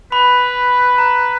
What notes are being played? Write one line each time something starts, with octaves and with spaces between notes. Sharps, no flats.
B4 B5
A#5